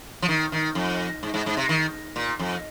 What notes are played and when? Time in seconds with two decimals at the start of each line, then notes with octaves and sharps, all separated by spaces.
0.22 F3
0.29 D#3
0.52 D#3
0.75 F2
1.23 G#2
1.34 G#2
1.46 G#2
1.57 C3
1.69 D#3
2.16 A#2
2.39 F2